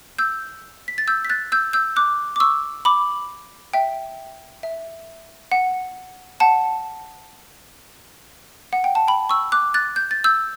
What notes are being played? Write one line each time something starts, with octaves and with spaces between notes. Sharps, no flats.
E6 G6
B6
A6
E6 G6
B6
F#6 A6
E6 G6
E6 G6
D6 F#6
D6
C#6 E6
B5 D6
E5 G5
E5
F#5
F#5 A5
F#5
G5
A5
G5 B5
C#6 E6
D6 F#6
F#6 A6
G6
A6
E6 G6